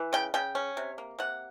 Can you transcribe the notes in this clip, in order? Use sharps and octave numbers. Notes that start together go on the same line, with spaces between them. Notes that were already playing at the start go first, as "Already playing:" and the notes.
Already playing: E3
C#3 G5
C#3 G5
C#4
C3
A#3
C3 F#5